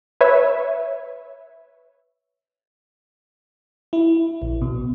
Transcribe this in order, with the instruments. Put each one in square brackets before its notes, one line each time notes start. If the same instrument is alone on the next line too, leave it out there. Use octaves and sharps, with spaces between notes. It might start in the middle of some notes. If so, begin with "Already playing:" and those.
[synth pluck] B4 C#5 E5
[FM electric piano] E4
A#1
B2